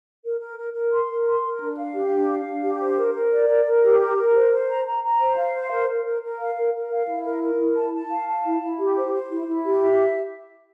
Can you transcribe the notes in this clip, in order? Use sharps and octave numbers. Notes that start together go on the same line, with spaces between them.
A#4
A#4
A#4
A#4
C6
A#4
C6
A#4
D4
F5
G4
D4
F5
D4
G4
C5
A#4
A#4
D5
A#4
A#4
G4
A#4
A#4
C5
C5
A#5
A#5
A#5
C5
F5
C5
A#4
A#4
A#4
A#4
F5
A#4
A#4
F5
E4
A#4
A#4
E4
A5
A5
F5
A5
E4
E4
G4
C5
C5
E4
E4
G4
E5